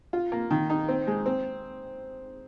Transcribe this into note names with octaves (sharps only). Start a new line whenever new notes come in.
F4
A#3
D#3
D#4
C4
G#3
C4